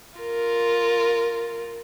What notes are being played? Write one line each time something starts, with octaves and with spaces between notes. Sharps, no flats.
F4 A#4